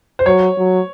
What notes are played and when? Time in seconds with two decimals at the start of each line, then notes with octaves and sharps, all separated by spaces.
0.19 C5
0.26 F#3 C#5
0.58 F#3